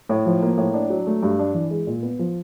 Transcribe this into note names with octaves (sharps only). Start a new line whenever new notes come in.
A2
F3
A#3
A2
D4
F#3
A3
G2
D4
E3
G#3
A#2
B3
F3